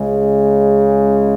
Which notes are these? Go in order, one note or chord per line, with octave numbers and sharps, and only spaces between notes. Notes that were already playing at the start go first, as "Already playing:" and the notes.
Already playing: C#2 C#3 G#3